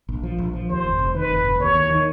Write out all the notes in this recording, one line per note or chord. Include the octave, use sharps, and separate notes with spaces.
A#1
F3
A#1
F3
D#2 C5
F1
F1
D#3 B4
F1
F1
D#2 C#5
D#2
D#3